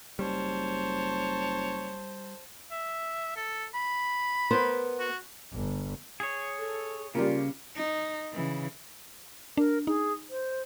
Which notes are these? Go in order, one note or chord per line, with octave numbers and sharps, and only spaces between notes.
F#1 G3 C5 C#5 A5
E5
A4
B5
B3 A#4 C5
F#4
G1
G#4 C#5
A4
C#3 G3 A#3 F4
D#4
C#3 E3
D4 A#4
D#4 G#4
C5